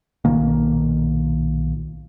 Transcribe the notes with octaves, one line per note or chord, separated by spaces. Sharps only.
B1 A#2 D#3 A#3